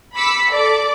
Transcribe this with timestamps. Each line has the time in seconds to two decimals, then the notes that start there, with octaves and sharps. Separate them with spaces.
0.15 B5 D6 E6 B6 C#7
0.51 A4 D5 D6